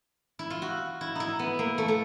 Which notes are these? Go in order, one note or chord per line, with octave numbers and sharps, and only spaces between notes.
E4
F4
F#4
E4
D#4 E4
B3
A#3
A3
A3